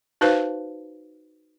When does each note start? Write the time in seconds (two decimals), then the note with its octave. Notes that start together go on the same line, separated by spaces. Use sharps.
0.21 D#4 F#4 B4 C5 F5